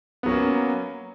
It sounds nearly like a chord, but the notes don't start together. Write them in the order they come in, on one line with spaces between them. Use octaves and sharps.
B3 F#3 C#4 A#3